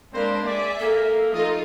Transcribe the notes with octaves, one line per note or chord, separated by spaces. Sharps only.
G#3 A#3 C4 D4 B4 C5
G#4 D5 E5
A#3 A4
F3 A3 D#4 F4 D#5